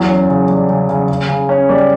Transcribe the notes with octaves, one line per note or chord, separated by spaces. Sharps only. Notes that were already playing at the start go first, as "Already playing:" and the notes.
Already playing: E2 F#3
C#4
C#3
G3
C#3
C#3
C#3
C#3
C#4
G3